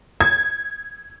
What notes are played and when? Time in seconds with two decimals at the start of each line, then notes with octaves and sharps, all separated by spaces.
0.21 G#6